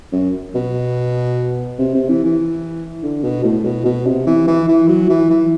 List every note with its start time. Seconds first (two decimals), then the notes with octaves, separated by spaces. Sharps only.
0.12 F#2
0.55 B2
1.78 C3
1.94 C3
2.09 E3
2.25 E3
3.03 D3
3.24 B2
3.44 A2
3.65 B2
3.85 B2
4.07 C3
4.27 E3
4.48 E3
4.68 E3
4.88 F#3
5.09 E3
5.30 E3